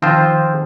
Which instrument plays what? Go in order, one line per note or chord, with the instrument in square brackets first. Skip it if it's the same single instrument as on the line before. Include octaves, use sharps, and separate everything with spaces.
[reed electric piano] D#3 [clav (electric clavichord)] F3 C4 F4 C5